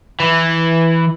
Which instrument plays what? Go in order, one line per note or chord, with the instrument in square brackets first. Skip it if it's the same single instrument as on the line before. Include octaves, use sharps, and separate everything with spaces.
[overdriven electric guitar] E3